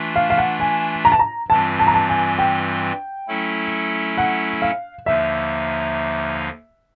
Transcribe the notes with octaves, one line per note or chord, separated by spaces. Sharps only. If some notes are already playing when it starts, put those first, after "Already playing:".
Already playing: E3 A3 D4 F4
F5
F5
F#5
G#5
A#5
A5
A#5
G2 E3 G3 C4 F4 A5
A5
A#5
A5
G#5
G5
F#3 A3 C#4 E4 A4
F#5
F5
D#2 D3 F3 A#3 D#4 E5